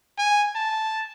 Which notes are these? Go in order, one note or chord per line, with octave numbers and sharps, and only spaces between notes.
G#5
A5